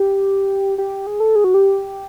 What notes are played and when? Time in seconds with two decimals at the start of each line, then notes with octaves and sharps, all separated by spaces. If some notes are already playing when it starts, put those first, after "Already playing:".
Already playing: G4
0.78 G4
1.07 G#4
1.20 A4
1.36 G#4
1.44 F#4
1.54 G4